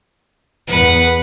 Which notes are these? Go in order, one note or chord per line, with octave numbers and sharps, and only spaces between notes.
E2 B4 F#5